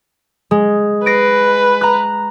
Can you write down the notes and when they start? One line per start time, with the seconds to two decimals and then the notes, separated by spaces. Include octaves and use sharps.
0.51 G#3
1.06 B4 A#6 C7 D7
1.81 A#5 F#6